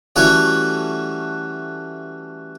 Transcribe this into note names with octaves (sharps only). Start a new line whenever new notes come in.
E3 G3 A3 C#4 F#4 C#5